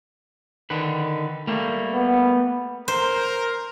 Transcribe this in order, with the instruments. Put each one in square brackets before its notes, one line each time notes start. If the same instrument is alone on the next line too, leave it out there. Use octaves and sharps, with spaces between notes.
[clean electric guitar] D3 D#3 B4
G3 A3 A#3
[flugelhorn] B3
[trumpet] A#4 [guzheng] C5